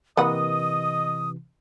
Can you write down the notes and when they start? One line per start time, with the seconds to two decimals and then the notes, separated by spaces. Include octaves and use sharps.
0.17 C3 E3 A#3 B4 D#5 F#5 D#6